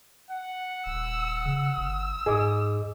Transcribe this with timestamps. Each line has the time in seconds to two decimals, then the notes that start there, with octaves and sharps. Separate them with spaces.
0.31 F#5
0.86 D#1 E6
1.45 C#3 E6
1.77 G1
2.26 G#2 G#4 D#5 D6